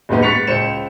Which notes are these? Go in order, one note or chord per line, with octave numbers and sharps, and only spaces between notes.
F#1 D#2 G#2 B3
C#6 F#6 A6 B6 C#7 F7
C#2 C5 C#7 E7